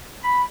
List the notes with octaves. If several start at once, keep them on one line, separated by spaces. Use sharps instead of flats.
B5